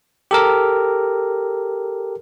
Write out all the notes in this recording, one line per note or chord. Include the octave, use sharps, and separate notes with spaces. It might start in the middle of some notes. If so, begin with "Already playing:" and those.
G4 A4 A#4